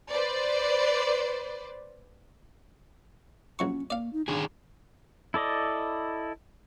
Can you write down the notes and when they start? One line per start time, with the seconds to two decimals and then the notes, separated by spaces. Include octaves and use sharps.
0.11 B4 C5 D5
3.59 A#1 F#3 C#4 C#6
3.90 A#3 D5 F5
4.13 D#4
4.28 D3 D#3 D4 G#4
5.34 E4 A4 D5 D#5